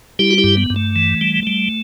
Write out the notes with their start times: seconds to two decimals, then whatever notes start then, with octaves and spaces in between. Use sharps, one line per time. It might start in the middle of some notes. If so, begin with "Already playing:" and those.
0.19 G3 E4 G4
0.31 F#4
0.38 E4 G4
0.44 G2
0.57 B3
0.70 G2
0.76 A3
0.96 E3
1.21 G3
1.47 G3